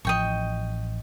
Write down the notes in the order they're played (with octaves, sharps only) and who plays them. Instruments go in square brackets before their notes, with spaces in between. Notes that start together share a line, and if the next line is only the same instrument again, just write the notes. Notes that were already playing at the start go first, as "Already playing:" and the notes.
[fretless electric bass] A1 F3 [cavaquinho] D#5 G5 C#6